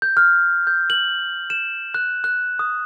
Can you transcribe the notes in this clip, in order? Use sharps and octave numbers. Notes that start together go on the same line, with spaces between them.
G6
F6
G6
F#7
E7
F#6
F#6
D#6